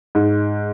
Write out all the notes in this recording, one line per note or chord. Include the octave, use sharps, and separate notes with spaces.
G#2